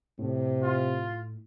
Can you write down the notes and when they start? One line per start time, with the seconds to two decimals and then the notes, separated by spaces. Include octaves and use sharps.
0.19 A2 C3
0.63 F4